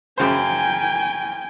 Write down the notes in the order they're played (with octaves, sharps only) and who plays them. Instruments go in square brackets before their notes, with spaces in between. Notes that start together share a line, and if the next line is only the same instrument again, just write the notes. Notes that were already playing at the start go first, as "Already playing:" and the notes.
[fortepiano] F#2 C#3 C5 [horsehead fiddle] G5 G#5